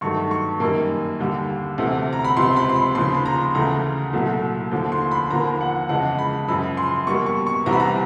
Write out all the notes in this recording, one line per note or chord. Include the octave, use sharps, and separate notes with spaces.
G2 D#3 F#3 A3 C#6
C#6
F#2 D#3 G3 A#3
D#2 D3 G3
D2 C3 E3 A3
A#5
B5
C#2 C3 F3 C6
B5
C6
B5
D#2 C#3 F3 C6
B5
A#5
D2 C#3 E3 A3 A#5
C2 A#2 F#3 A3
D#2 D3 F3 A3
C6
B5
D#2 D3 F3 A#3 A#5
F#5
F2 C#3 E3 G#3 F#5
B5
F#2 C#3 F3 B5
C6
B2 G3 A#3 C#6
C#6
C#6
C2 C3 E3 G3 B3 A#5
B5
A#5